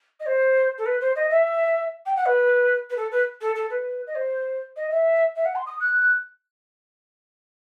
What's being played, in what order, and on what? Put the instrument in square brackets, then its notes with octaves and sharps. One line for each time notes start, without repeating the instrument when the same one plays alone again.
[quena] D#5
C5
A4
B4
C5
D#5
E5
G5
F#5
B4
B4
A4
B4
A4
A4
B4
D#5
C5
D#5
E5
E5
F#5
C6
D#6
F#6